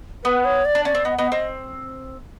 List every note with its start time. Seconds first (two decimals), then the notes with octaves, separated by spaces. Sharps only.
0.24 B3 B4
0.45 C#5
0.65 D5
0.75 D4
0.85 C#4 D5
0.95 C4
1.05 B3 D#5
1.18 B3 D#5
1.31 C4 D#5